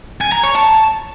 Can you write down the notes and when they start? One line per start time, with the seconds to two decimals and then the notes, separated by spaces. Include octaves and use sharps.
0.21 G#5
0.32 A#5
0.43 C#5
0.55 A5